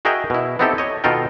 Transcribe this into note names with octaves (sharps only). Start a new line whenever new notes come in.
F#4 G#4 A#4 D#5 E5 G5
B2 E4
B3 C4 D#4 E4 G4 A4
C#5 D#5
B2 D#3 F4 A4 A#4 G5